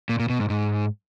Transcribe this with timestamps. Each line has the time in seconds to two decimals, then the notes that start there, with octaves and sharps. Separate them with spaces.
0.09 A#2
0.19 A#2
0.30 B2
0.40 G#2
0.50 G#2